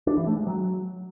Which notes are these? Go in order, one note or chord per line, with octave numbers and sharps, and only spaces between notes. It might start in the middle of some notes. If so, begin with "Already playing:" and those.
D4
E3
A3
G#3
F#3